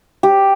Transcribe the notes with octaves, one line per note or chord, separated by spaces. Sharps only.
G4